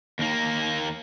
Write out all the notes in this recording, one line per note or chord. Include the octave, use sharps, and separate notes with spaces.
D#2 A#3